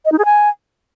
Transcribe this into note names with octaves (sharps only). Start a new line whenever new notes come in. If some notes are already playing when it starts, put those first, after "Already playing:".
D#5
D#4
G#4
G#5